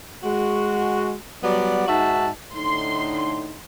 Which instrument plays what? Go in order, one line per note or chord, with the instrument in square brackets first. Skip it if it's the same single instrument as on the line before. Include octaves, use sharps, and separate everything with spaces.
[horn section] G#3 F#4
F#3 G3 B3 D5
G#2 D#4 F#4 E5 A5
[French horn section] A2 D3 D#4 [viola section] C6